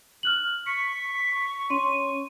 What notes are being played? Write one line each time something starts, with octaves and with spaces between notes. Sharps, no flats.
F6 F#6 F#7
C#6 B6 C#7
C#4 C6 D#7